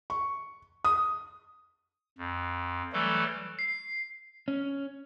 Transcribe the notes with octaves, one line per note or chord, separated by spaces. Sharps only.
C#6
D#6
F2
E3 F#3 G3 A3 A4
C7
C#4